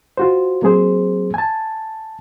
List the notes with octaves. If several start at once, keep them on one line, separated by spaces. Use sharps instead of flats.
F4 F#4 C5
F#3 A#3 C4 G#4 C5
G#5 A5